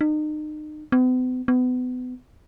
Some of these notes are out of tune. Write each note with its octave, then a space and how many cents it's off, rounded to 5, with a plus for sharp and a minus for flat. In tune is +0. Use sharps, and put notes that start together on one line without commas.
D#4 -35
B3 +45
B3 +30